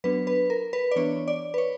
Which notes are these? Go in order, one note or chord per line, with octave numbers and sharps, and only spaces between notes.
F#3 B3 D4 B4
B4
A#4
B4
D5
E3 B3 D4 C#5
D5
B4
C#5